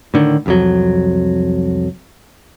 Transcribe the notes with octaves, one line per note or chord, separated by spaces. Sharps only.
A2 D3 D#3
C2 F2 F#3